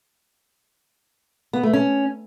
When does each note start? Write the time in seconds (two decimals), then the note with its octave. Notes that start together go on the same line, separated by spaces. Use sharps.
1.53 B3
1.63 A3
1.73 C#4